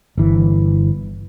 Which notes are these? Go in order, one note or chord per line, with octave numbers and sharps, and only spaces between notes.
G1 E3